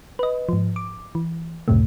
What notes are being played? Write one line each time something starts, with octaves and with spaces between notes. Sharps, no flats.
B4 D#5
G#2 F3
D6
E3
C#2 F#2 A2 C3 A3